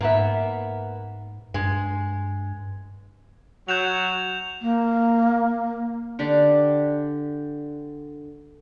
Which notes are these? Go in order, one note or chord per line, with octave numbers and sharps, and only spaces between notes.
G#2 A#3 B3 E5
G2 G#3
F#3 F#4 G6 E7 F7
A#3
D3 D4 G4